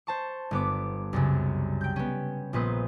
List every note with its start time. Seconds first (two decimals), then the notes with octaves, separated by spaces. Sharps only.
0.07 C5 A5 C#6
0.51 G1 B3 D6
1.13 C2 F#2 C#3
1.81 G5 G6
1.96 B3 C#4
2.53 A#1 A#2 B3 B4 C5 D#6